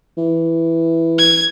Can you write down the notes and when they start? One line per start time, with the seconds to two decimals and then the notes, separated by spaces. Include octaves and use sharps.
0.17 E3
1.19 G#6